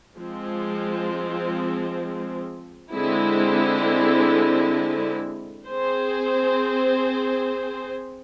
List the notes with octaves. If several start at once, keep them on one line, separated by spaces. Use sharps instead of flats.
F3 G#3 C4
D3 G#3 C4 E4
C4 G#4 C5